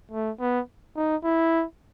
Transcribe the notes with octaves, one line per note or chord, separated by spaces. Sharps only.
A3
B3
D#4
E4